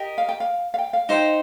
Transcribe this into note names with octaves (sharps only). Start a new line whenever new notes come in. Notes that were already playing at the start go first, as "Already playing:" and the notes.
Already playing: G4 A#4 D#5
F5
G5
F5
F5
G5
F5
D#4 C5 G5